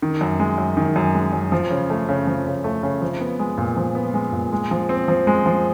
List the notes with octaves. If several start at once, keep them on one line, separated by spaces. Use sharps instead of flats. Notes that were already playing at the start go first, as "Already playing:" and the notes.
D#3
F#2
G#3
F#2
D#3
F#2
G#3
F#2
F3
C#3
A3
C#3
F3
C#3
A3
C#3
F3
B3
G#3
A#2
F3
B3
G#3
A#2
G#3
F3
C4
F3
G#3
F3